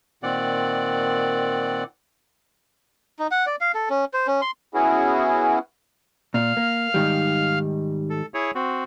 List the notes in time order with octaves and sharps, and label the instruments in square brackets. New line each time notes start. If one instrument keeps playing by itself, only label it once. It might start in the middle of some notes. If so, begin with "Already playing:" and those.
[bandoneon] A#2 D#3 C4 D5 F#5
[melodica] D#4
F#5
D5
F5
A4
C#4
C5
C#4
C6
[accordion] B3 C#4 E4 F#4 G#4
[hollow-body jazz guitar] A#2 [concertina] F5 F6
[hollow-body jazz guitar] A#3
G#2 D#3 G3
[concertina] A4
E4 G#4 C#5
C4 F#4